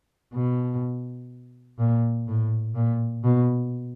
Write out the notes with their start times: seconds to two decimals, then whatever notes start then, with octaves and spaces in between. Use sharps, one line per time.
0.34 B2
1.79 A#2
2.28 A2
2.75 A#2
3.24 B2